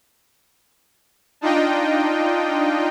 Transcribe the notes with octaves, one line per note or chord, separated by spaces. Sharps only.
D4 D#4 F4 D#5 G5